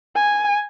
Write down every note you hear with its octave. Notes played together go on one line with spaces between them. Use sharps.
G#5